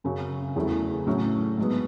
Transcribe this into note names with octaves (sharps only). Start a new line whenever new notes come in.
F#2 C#3 F#3 C#4
E2 C#3 F#3 A3 E4
A2 F#3 C#4 E4
G#2 F#3 B3